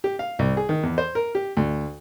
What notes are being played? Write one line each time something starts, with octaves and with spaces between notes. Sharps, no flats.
G4
F5
C2
G#4
D#3
E2
C5
A#4
G4
D2